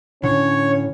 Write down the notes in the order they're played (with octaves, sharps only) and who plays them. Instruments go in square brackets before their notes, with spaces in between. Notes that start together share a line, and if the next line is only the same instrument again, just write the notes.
[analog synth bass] A2 [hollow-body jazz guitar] D3 [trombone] C#4 [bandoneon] C#5